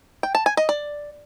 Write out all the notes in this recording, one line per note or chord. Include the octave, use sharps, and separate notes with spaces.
G5
A5
G#5
D#5
D5